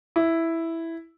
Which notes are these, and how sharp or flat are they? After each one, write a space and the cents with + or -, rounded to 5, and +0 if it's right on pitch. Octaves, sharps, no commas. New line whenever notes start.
E4 +0